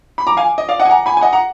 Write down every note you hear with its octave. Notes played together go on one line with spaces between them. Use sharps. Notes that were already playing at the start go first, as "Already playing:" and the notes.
B5
A#5 D6
F5 G#5
D#5
D5 F5
D#5 F#5
G#5
F#5 A#5
G#5 B5
G#5
D#5 F#5
F#5 A#5